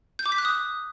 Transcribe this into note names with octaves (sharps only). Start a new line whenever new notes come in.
G6
D6
B6
F#6
D#6